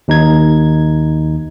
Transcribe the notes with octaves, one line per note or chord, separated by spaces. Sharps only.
D#2 D#4 G#6